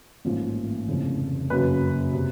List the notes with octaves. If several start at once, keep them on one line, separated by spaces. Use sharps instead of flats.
A1 G#2 F3 A#3
F1 F2 C#3 E3
F#2 C#3 F#3 A#3 B4
C3